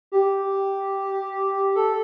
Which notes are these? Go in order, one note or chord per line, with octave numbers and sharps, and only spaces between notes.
G4
A4